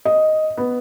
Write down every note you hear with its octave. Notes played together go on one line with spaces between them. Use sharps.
D#5
B3